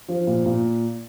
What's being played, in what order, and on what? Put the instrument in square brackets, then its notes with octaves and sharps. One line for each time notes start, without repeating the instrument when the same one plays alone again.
[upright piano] F3
A#2
A#2